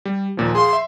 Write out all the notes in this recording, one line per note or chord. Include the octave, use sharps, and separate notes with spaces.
G3
D#2 A#2 F3
G#4 F5 C6
E5